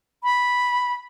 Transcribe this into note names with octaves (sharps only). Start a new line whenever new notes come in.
B5